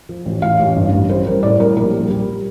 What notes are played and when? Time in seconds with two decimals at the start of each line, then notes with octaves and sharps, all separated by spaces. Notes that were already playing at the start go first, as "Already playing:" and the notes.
0.09 F3
0.26 A1
0.42 A1 F5
0.60 A1
0.76 G2
0.93 A1
1.09 G3 C5
1.27 G3 A#4
1.43 A2 D5
1.60 G3 A#4
1.77 A#1 A#4
1.93 G3
2.10 G3